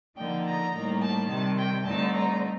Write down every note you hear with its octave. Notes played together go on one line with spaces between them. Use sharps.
D3 F3 A#3 D#4 G5
A#5
A2 G3 A#3 D#4
A5
C3 D#3 G3
G5
G2 D3 A3 C4 D#4 A5
A#5